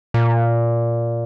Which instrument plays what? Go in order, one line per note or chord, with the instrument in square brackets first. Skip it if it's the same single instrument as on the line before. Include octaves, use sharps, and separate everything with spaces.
[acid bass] A#2